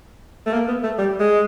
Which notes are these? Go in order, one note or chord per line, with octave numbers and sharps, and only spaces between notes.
A3
A#3
B3
A3
G3
G#3